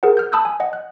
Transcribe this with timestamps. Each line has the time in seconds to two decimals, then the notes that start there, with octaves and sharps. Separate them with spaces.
0.03 G#4 A#4 C5 F#5
0.17 F6 G6
0.32 A5 B5 D#6 E6 F#6 G6
0.45 G#5
0.60 D#5 F#5
0.73 F#6